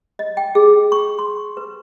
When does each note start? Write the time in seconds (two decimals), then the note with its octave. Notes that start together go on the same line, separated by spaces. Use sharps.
0.19 D#5
0.37 G5
0.55 G#4
0.92 C#6
1.19 C6
1.57 B4